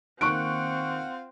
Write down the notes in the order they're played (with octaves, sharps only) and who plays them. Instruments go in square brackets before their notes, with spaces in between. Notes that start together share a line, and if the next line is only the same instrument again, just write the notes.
[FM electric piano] D#3 A#3 [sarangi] C4 [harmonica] F4 F#5 [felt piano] C#6 F#6 D7